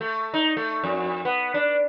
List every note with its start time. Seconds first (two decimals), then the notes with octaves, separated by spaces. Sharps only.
0.01 A3
0.34 D#4
0.57 A3
0.84 F2
1.25 B3
1.54 D4